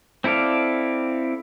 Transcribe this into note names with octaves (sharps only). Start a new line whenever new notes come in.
C4 E4 A4 D5 F5